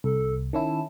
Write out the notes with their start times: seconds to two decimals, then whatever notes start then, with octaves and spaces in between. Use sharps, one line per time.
0.04 C2 A4
0.53 D#3 C#4 E4 A5